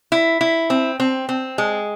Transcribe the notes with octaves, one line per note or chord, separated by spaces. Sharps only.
E4
E4
C4
C4
C4
G#3